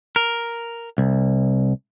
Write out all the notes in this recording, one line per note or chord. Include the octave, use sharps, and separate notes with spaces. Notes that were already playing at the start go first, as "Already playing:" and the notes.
A#4
C2